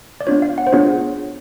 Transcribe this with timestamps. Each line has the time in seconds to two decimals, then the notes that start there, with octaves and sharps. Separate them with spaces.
0.21 D5
0.27 B3 D4 F4 C#5
0.42 F5
0.58 F#5
0.67 C5
0.73 B3 D4 F4 G#4 C#5